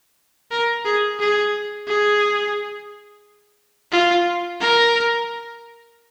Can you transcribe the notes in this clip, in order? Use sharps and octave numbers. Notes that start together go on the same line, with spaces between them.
A#4
G#4
G#4
G#4
F4
A#4